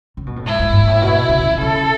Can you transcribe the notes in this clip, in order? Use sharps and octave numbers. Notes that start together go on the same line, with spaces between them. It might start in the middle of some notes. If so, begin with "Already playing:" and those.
C#3
B2
A2
G#2 E4
G#2
G#2
A2
B2
C#3
D#3
C#3 A4